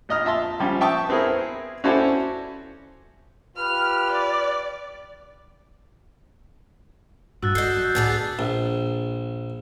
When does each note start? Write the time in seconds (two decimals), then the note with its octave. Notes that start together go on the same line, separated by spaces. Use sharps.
0.09 A#1 D#5 F6
0.25 F4 E5 A5 C6
0.60 F3 G3 C#4
0.81 E5 G5 A5 C#6 D#6
1.09 B3 C4 E4 G#4 A#4
1.84 C#4 E4 F#4 A4 C5 D5
3.56 F4 G4 B4 F6
4.12 D5
7.42 G2 F#4 E6 F#6 A6
7.55 E4 A4 D#5 G6 C7
7.77 F#3
7.95 C#2 A2 B3 D4 F#4 G#4
8.39 A#1